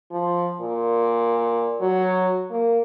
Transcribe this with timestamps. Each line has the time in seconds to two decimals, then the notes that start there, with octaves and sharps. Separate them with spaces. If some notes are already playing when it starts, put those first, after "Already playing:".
0.11 F3
0.61 A#2
1.81 F#3
2.51 A#3